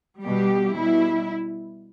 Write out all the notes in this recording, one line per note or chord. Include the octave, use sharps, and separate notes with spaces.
B2 G3 G4
B2 G3 E4